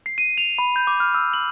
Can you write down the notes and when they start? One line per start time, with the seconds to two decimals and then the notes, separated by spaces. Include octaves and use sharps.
0.06 C7
0.18 D#7
0.38 F7
0.58 B5
0.76 G6
0.87 D6
1.00 F6
1.15 E6
1.34 F#7